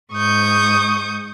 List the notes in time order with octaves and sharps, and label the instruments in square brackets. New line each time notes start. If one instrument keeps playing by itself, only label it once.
[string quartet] G#2 C#6 D#6 G6